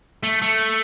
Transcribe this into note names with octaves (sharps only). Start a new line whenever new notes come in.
A3
A3